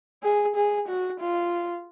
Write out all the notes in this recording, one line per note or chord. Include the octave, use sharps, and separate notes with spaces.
G#4
G#4
F#4
F4